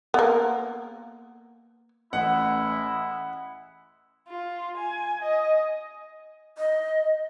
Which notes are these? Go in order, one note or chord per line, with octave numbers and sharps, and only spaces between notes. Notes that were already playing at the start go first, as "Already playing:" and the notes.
A#3 B3
A1 G#3 E4 F#5
F4
G#5
D#5
D#5